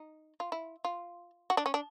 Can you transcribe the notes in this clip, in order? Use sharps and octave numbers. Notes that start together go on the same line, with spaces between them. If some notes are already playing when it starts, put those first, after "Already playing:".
Already playing: D#4
F4
E4
F4
F#4
D4
C#4
D4